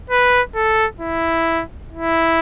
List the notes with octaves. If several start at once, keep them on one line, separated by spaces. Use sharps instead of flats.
B4
A4
E4
E4